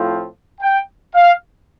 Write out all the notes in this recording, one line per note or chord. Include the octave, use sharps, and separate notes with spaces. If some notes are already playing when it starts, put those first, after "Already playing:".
Already playing: A2 F3 C4 F4
G5
F5